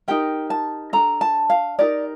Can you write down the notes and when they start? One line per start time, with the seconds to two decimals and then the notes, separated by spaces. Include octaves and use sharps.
0.08 D#4 G4 A#4 G5
0.50 A5
0.93 D4 A4 A#5
1.21 A5
1.50 F5
1.79 D#4 G4 A#4 D5